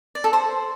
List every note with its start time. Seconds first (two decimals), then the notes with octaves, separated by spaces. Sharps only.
0.15 D5
0.24 A4
0.33 C5